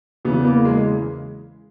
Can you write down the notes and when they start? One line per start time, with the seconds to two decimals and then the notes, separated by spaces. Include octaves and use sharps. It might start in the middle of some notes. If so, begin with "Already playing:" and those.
0.25 E2 C#3 E3 B3
0.44 A#3
0.65 G#3